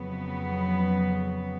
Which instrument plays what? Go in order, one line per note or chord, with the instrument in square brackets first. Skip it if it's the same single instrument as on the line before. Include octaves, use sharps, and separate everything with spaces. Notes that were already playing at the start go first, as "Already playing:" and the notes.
Already playing: [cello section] F2 C#3 F#3 B3